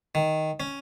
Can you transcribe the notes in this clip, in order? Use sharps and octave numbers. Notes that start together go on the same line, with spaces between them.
D#3
C#4